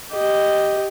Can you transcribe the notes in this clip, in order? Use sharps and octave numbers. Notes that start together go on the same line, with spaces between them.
G4 D#5